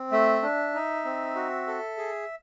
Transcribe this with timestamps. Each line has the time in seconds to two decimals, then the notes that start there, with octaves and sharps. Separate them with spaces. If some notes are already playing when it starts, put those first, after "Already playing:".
Already playing: C4
0.12 A3 E5
0.43 D4
0.74 D#4
1.05 C4
1.35 F#4
1.67 A4
1.98 G#4